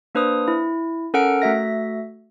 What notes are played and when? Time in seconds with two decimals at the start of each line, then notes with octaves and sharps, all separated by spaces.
0.15 A#3 D4 B4 C5 D#6
0.48 E4
1.14 C#4 A4 A#4 F#5 F6 D7
1.42 A3 F#4 E5 A#6